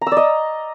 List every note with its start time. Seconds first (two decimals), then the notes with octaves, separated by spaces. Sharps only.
0.01 A#5
0.07 E6
0.12 D5
0.17 D#5